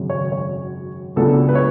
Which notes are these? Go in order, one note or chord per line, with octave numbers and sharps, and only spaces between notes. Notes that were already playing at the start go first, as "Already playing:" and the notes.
Already playing: G#1 F#2 C#3
C#5
C#5
C#2 C#3 F#3 B3 D4 A4
B4
C#5